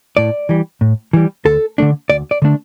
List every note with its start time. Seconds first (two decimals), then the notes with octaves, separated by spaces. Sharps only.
0.17 A2 D5
0.49 E3 G3
0.81 A2
1.13 E3 G3
1.45 D2 A4
1.78 D3 A3 D4
2.10 D2 D5
2.31 D5
2.42 D3 A3 D4